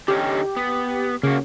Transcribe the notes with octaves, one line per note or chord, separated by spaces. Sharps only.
D3 C#4 D#4 G4
B3
C#3 A#3 F#4